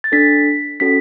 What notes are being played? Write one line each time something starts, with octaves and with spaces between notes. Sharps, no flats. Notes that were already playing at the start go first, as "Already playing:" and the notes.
A6
D4 A4 B6
C#4 F#4 A4 B6